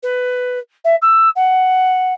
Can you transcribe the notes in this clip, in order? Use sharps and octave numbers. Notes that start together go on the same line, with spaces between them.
B4
E5
E6
F#5